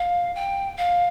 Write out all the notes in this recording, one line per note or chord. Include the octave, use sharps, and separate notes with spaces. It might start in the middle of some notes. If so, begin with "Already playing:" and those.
Already playing: F5
G5
F5